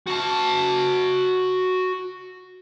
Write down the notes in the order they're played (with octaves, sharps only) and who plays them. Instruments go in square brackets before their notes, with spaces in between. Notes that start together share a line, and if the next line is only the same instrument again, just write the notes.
[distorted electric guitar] F#4 A5